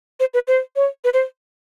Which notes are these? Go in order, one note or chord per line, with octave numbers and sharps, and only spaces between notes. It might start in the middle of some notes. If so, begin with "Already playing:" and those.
C5
B4
C5
C#5
B4
C5